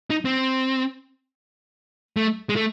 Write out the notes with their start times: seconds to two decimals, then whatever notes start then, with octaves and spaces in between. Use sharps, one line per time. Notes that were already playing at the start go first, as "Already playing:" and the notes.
0.10 D#4
0.25 C4
2.17 A3
2.49 G#3
2.56 A3